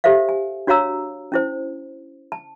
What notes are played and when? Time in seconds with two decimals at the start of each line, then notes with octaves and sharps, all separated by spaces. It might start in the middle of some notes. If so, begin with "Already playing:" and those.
0.04 G4 A4 C5 E5 F5
0.29 G#5
0.67 D4 F#4 C#5 F5 A#5 E6
1.32 C#4 E4 C5
2.32 A5